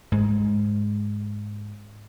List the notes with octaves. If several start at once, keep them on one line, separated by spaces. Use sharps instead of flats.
G#2 G#3